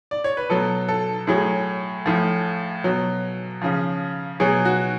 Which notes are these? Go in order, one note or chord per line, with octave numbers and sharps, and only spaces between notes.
D5
C#5
B4
B2 F#3 A4
A4
A2 F#3 G#4
A2 F3
B2 F#3
C#3 F3
B2 F#3 G#4
F#4